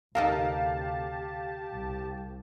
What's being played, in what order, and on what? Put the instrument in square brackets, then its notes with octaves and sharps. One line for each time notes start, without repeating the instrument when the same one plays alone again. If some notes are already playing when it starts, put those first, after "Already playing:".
[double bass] D2 C3 [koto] D#4 A4 A#4 [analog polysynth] G4 A5 [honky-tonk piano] F5
[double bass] C2